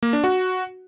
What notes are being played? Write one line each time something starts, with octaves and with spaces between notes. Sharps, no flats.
A#3
D4
F#4